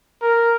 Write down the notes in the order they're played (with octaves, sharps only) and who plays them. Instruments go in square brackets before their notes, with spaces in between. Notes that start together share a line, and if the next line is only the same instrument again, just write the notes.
[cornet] A#4